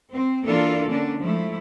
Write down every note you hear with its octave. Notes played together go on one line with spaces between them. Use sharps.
C4
E3 A#3 D4 F4 A4 D5
D3 A#3 C#4 D4
F3 G#3 A3 E4